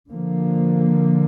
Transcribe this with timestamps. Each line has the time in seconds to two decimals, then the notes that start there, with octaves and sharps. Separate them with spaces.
0.11 D3 F3 A#3